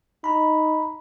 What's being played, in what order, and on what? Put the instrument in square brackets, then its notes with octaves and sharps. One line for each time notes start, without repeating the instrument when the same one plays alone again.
[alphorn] D#4 [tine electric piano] A#5 B5